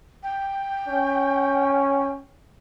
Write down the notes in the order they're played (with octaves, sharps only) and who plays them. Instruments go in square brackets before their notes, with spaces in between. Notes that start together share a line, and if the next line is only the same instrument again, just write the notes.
[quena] G5
[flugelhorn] C#4